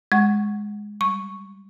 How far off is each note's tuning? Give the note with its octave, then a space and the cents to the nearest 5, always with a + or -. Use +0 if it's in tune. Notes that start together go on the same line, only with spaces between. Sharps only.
G#3 +0 F#5 +0 C#6 +0
G3 +0 C#6 +0